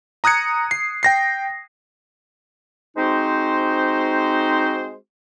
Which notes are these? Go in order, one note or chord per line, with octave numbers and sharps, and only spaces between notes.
A#5 D#6 F#6 G#6 C#7
C7
G5 A#6 C7
G#3 C4 D#4 F#4 C5